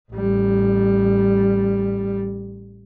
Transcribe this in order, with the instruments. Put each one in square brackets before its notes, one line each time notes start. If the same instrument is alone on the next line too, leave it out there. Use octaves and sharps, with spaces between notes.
[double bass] A1 G3